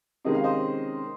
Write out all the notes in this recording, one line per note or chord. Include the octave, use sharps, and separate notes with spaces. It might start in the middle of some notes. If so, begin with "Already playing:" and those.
C3 D#3 G#3 C#4 D#5
F5
C5 D#5